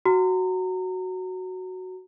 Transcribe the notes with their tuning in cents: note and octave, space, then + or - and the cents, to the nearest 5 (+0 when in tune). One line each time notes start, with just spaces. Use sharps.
F#4 +5 A#5 -30